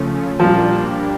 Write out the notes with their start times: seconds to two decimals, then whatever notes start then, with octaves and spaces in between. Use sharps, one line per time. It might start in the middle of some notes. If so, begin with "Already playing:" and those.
Already playing: C#3 F3 A3 C#4
0.40 A#2 F3 G3 A#3 D4 G4